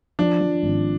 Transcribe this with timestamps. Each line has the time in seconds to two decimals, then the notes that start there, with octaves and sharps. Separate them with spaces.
0.19 F3 D4
0.41 F3
0.63 G#1